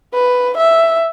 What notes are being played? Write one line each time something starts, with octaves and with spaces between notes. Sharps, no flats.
B4
E5